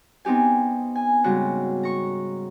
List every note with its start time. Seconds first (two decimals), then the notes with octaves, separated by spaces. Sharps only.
0.25 B3 C4 D#4 G4 G#5
0.95 G#5
1.24 G#2 C#3 G3 F#4
1.83 A#5 C#6